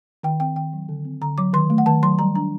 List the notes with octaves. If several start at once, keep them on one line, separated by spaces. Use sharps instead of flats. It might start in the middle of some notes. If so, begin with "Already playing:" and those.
D#3 G5
C4 G5
D#3 G5
F#3
D3
C4
D3 A#5
F#3 D6
D#3 C6
A3
F#5
D#3 A5
F#3 C6
G3 A#5
D4 A#5